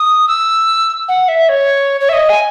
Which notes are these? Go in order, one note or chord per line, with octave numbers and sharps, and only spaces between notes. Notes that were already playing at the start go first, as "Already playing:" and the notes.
Already playing: D#6
E6
F#5
E5
C#5
C#5
E5
D#5
G#5